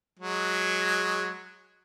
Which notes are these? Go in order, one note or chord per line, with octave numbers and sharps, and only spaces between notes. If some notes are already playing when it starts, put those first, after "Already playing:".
F#3 G#3